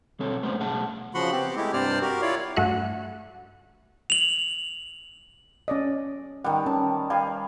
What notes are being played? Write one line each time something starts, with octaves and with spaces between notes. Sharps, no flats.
B1 C4 A4 C#5
G2 C#3 G#3 A3 B3 C5
B1 A3 G#4 F#5 A5
C#3 F3 F#4 F#5 B5 C6
B3 C4 G4
G#3 A3 E4 G4
G2 C3 C4 C5 D5 F6
F#4 G4 A#4
E4 F4 C#5 D5 F5
G2 A3 F#4 E5 F#6
F7 F#7
C#4 D5 D#5
D#3 G3 F#5
C#4 A5
G3 F5 G#5